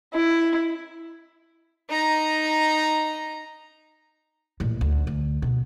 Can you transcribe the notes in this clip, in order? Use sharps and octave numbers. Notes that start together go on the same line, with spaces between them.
E4
D#4 A#5
A1 A#2
D2
D2
B2